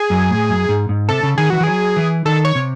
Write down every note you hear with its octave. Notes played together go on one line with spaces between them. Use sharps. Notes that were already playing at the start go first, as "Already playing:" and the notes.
Already playing: G#4
F#2
A2
F#2
G#2
G#2
C3 A4
C#3
D#3 G#4
E3 F#4
E3
F#3 G#4
E3
D#3 A4
C#5
C3